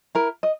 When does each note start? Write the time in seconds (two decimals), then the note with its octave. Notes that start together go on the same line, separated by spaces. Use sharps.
0.15 E4 A#4
0.43 D#5